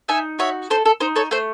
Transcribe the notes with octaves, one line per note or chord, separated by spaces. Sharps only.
D#4 E5 G#5
F#4 C#5 E5
A4 C5
A4
D#4 C5
A4 C#5
A3 C5